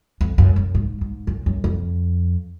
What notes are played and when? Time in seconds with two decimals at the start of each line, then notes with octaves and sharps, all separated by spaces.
0.21 F2
0.38 F#2
0.56 F#2
0.75 G#2
1.01 G#2
1.27 F#2
1.46 F#2
1.64 F2